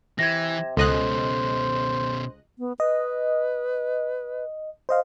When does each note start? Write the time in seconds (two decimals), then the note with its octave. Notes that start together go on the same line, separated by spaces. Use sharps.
0.19 C3 E3 G#6 A#6
0.77 C#2 B2 C#4 A4 C5 D#5 F#6
2.59 B3
2.80 B4 D#5
4.89 C5 D#5 F5